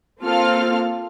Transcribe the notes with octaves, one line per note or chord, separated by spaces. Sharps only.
A#3 C4 F4 A4 F5 F6